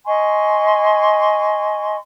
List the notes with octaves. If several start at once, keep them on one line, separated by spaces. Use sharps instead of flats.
D#5 G#5 C6 C#6